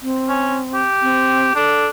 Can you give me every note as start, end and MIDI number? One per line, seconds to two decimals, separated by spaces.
0.02 0.84 60
0.29 0.57 61
0.74 1.54 67
1.02 1.55 60
1.55 1.88 62
1.55 1.87 69